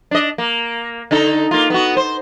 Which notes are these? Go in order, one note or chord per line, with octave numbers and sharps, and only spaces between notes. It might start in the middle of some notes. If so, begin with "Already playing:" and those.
D4 D#5
A#3
D3 D#4 A4
A#3 F4
B3 F#4
C5